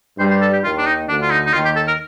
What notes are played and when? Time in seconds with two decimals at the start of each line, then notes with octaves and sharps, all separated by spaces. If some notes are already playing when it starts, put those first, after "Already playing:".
0.19 G2 G3 C5
0.31 C5
0.42 A4
0.53 G4
0.64 D#2 D#3 F4
0.78 D4
0.86 D#4
1.09 D2 D3 D4
1.22 F4
1.31 D#4
1.46 D#4
1.54 D#2 D#3 F4
1.65 G4
1.76 A4
1.88 A#4